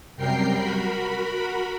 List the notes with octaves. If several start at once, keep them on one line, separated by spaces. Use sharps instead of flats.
F#2 C3 G3 A#4 G5 C7
F#4 A#4 B5